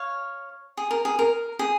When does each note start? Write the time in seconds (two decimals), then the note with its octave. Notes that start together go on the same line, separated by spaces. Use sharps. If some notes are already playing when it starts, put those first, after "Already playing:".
Already playing: C#5 F5
0.77 G#4
0.91 A#4
1.05 G#4
1.19 A#4
1.59 G#4